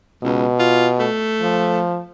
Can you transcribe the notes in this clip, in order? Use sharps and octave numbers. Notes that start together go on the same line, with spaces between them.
C#2 B2
F4
A3
F3